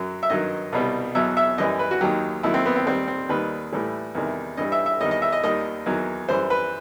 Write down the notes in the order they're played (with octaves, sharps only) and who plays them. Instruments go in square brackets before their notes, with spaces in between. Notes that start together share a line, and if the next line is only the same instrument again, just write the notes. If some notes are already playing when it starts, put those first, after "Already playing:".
Already playing: [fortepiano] F#2 F#3
E5
G2 D#3 F#3 D#5
C2 B2 G3
E2 B2 F#3 E5
E5
F#2 E3 G3 D#5
B4
F#4
D#2 D#3 F#3 G4
D#2 D#3 F#3 E4
C4
B3
C4
D#2 D#3 G3 C4
C4
D#2 D#3 G3 B4
A2 E3 G3
E2 C3 D#3 G3
G2 E3 G3 D#5
E5
E5
E2 D#3 G3 D#5
D#5
E5
D#5
D#2 D#3 G3 D#5
E2 D#3 F#3
F#2 E3 G3 C5
B4